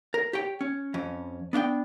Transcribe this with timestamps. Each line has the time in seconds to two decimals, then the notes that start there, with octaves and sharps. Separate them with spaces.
0.14 A#4
0.33 G4 C#5 G5
0.61 C#4
0.94 F2 C#4
1.53 B3 D4 E5 G5